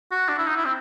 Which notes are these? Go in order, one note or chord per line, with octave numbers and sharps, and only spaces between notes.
F#4
D4
E4
D#4
E4
C4